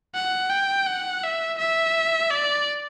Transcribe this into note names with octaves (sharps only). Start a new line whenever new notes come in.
F#5
G5
F#5
E5
E5
D5